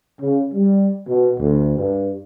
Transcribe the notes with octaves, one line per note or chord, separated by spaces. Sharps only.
C#3
G3
B2
D2
G2